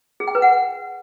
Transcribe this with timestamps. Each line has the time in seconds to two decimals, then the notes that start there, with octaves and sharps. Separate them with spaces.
0.20 G#4
0.28 G5
0.35 B4
0.42 F#5